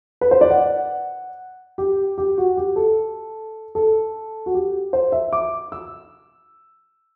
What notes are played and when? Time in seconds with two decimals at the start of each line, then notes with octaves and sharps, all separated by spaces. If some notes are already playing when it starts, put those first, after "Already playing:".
0.21 B4
0.31 C5
0.41 D5
0.50 F#5
1.78 G4
2.18 G4
2.38 F#4
2.57 G4
2.76 A4
3.75 A4
4.46 F#4
4.54 G4
4.93 C5
5.12 E5
5.33 D6
5.72 E6